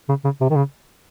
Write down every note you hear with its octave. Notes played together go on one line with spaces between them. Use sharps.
C#3
C#3
C3
D#3
C#3